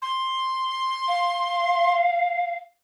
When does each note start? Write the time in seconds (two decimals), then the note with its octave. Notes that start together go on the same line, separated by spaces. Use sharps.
0.02 C6
1.07 F5